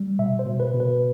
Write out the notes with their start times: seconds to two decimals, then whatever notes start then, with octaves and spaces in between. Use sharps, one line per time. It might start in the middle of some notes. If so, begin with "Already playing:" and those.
Already playing: G3
0.19 B2 E5
0.39 C5
0.46 B2
0.60 B4
0.74 B2
0.80 B4